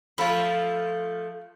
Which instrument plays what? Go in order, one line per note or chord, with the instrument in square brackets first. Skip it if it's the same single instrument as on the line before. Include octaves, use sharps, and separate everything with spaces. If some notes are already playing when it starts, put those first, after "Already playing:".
[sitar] F3 A3 A4 [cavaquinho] F4 B5